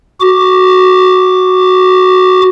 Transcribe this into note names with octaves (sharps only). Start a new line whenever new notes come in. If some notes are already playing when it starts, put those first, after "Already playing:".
F#4 D6